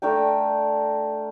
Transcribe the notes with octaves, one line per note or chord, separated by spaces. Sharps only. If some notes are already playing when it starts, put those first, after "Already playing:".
A3 D4 A#4 G5